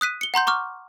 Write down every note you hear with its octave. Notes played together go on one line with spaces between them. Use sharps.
D#6 F#6 B6 D#7
C#7 G7
F#5 A#5 C6 G6
A#5 C#6 D6 F6